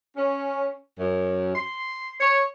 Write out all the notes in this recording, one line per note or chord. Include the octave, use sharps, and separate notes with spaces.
C#4
F#2
C6
C#5